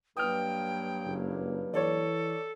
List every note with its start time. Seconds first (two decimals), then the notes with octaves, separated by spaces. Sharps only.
0.17 G2 F#3 A#3 G5 D#6 F6
1.05 F#1
1.74 E3 A4 C#5 D5